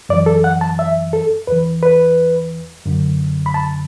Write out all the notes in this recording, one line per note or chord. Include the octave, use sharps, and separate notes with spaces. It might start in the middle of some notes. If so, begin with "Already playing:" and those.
F#2 E3 D5
A4
F#5
A5
E5
A4
E2 E3 B4
B4
F#2 D3
B5
A5